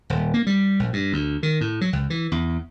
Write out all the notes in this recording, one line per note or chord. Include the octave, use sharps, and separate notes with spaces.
D#1
A#3
G3
A#1
G2
D2
D#3
A2
F#3
C#2
E3
E2